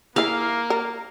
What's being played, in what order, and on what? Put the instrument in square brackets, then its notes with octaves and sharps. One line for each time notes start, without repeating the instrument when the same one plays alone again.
[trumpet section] A#3 [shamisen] E4 G#4 [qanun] F5
[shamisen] A#4